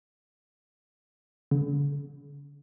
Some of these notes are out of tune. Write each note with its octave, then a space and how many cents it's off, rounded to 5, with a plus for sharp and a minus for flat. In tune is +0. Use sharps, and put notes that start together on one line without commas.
D3 -45